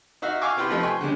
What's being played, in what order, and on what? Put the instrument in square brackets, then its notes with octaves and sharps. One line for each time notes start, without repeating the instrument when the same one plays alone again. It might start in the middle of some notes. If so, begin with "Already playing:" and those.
[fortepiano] D#4 F#4 E5 F5
F5 G5 G#5 C#6 D6 E6
C4 E4 F4 G4 B4 C6
C3 F3 A3 D#4 F4 B4
G5 G#5 C6 C#6
D3 G3 G#3 C#4